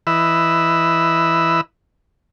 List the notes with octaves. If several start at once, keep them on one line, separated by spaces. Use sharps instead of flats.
E3 B4 D#5 E5 B5 E6